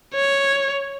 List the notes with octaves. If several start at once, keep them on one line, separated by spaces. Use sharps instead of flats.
C#5